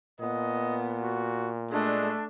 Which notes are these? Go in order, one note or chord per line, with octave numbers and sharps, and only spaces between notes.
A#2 B3 D#5
F#4
G#3 A3 D4